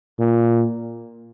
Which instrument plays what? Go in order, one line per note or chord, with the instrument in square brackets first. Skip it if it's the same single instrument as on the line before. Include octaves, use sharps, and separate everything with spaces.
[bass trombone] A#2